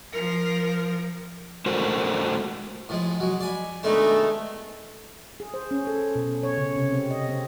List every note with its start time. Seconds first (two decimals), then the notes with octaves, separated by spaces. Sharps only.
0.12 F3 A#4
1.66 G#3 A3 F#4 A#4 C5
2.89 A2 F3 G#3
3.20 F#3 G#3
3.40 D5 G#5 B5
3.83 B2 D#3 G#3 A3 C#4 D4
5.40 G#4
5.54 C5
5.71 C#4
5.87 A4
6.15 B2
6.43 C#5
6.57 C#3
6.76 C3
6.92 C4
7.11 D#5
7.29 C4